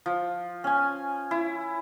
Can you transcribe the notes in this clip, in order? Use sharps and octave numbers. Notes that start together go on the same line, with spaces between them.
F3
C#4 G#5
E4